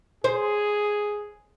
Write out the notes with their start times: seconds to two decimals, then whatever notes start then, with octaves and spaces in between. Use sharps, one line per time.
0.24 G#4 C5